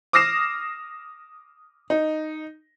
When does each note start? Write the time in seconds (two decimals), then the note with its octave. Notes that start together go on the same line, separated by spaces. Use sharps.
0.13 D6 D#6 F6 A#6 C7 E7
1.90 D#4